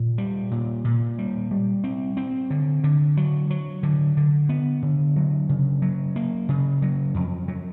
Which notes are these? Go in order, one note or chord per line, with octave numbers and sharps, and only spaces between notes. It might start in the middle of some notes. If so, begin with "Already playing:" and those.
Already playing: A#2
G3
A#2
A#2
G3
G3
C4
C4
D3
D3
F#3
F#3
D3
D3
B3
D3
F#3
C#3
F#3
A#3
C#3
F#3
F2
F#3